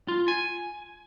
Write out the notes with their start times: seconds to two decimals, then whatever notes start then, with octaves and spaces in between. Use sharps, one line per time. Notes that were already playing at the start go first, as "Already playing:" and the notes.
0.08 F4
0.28 G#5